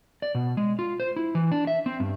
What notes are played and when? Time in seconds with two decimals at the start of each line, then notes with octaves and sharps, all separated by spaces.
0.22 D5
0.35 B2
0.57 G#3
0.79 F4
1.00 C5
1.16 E4
1.35 E3
1.52 D4
1.67 E5
1.86 C4
2.00 G2